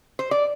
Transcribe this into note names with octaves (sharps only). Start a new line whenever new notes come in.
C5
D5